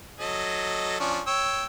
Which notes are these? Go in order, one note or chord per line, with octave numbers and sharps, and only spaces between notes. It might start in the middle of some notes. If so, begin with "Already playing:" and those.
F#3 A4 D#5
F3 C#4 D4
C#5 G5 E6